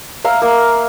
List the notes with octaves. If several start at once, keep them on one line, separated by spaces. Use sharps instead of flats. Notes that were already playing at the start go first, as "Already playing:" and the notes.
E5 F5 A#5
A#3